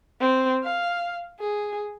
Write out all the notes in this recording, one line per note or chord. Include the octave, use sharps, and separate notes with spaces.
C4
F5
G#4